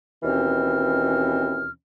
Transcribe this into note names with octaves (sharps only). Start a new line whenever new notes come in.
D#2 B2 E3 C4 C#4 F6